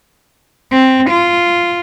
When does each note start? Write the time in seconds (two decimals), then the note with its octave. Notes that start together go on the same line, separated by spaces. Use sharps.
0.72 C4
1.10 F4